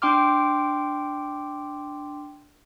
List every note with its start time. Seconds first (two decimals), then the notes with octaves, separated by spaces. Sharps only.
0.02 D4 G5 C6 D6 F6